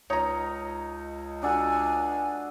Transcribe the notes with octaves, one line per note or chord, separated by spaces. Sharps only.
C#2 D#4 C#5 A#5
D4 F#4 A4 G#5